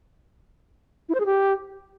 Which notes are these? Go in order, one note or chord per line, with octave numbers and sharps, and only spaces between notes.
E4
C5
G#4
G4